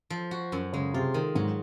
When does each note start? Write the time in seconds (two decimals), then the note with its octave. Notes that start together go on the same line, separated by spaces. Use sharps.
0.10 F3
0.31 F#4
0.52 F#2
0.73 C#3 G#3
0.94 C3 F4
1.14 D#3
1.35 G#2 F#3